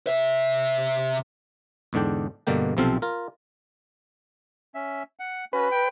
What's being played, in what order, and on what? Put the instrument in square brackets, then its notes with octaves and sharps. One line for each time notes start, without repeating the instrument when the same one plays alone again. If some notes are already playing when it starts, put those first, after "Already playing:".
[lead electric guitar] C3 E5
[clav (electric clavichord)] E2 G#2 D3 D4 G5
G2 B2 D3 A#3 G5
B1 C3 F3 C4 A4 F5
F4 A#4
[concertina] C#4 E5
F#5
[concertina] C#4 F#4 [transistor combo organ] B4
[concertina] G5